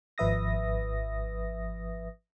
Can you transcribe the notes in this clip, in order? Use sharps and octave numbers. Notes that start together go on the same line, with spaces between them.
G#1 F3 B4 E5 D#6 A#6